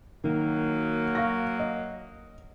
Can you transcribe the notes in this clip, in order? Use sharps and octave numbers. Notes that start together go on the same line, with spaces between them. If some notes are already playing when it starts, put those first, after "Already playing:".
D#3 F#3 A#3
F5 C#6 A#6
D#5